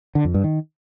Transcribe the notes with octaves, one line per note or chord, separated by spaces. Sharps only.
D3
F2
G2
D#3